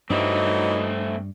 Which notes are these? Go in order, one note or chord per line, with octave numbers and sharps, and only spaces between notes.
G2 E3 F#3 G3 A3 C4 D#4